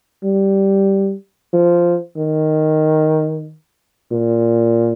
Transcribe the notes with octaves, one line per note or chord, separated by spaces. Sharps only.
G3
F3
D#3
A#2